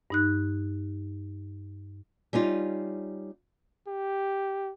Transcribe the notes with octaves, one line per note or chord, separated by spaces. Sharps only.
G2 D#4 F#6
G3 C#4 D#4 F4
G4